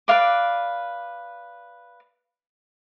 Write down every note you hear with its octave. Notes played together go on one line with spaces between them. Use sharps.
B4 D5 F5 D6